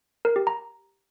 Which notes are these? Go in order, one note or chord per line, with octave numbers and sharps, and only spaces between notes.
A#4
G4
A#5